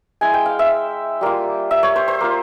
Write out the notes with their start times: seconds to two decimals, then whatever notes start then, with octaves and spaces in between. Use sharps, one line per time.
0.21 G#3 E4 G#5
0.34 G5
0.46 F5
0.59 E5
1.21 G3 A#3 F4
1.71 E5
1.83 C#5
1.96 C5
2.08 C5
2.21 A#3 F4